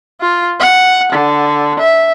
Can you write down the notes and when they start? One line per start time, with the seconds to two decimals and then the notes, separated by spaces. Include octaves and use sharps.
0.21 F4
0.60 F#5
1.12 D3
1.79 E5